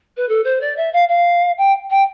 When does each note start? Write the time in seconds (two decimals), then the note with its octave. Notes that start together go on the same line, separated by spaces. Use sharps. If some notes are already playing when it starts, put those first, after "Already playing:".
0.17 B4
0.28 A4
0.44 C5
0.61 D5
0.77 E5
0.93 F5
1.08 F5
1.57 G5
1.90 G5